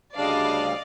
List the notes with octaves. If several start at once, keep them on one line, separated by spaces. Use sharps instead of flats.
D2 C#3 G3 D4 D5 D#5 F5